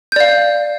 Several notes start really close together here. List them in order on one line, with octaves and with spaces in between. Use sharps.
G6 D5 F5